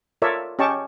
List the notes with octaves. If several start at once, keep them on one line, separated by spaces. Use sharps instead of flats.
F4 A4 A#4 C#5 D5 E5
C#4 G4 D#5 G5 A5 C#6